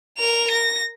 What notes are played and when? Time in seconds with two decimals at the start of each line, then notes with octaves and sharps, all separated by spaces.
0.18 A#4 F7
0.51 A#6